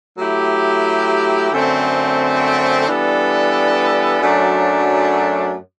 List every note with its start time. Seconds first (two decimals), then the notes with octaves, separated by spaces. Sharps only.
0.18 F#3 A3 E4 G4
1.52 F#2 D3 A3 C4
2.87 E3 G3 B3 D4 A4
4.22 F#2 F#3 A3 D4